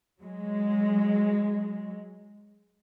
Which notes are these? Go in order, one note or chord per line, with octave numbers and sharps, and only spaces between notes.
F#3 G#3